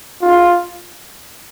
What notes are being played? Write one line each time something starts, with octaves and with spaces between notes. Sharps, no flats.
F4